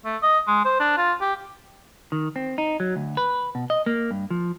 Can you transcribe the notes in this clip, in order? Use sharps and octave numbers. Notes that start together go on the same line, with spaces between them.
A3
D#5
G#3
C5
D4
F4
G4
D#3
C4
D#4
F#3
D2
B4
B2
D#5
A#3
G2
F3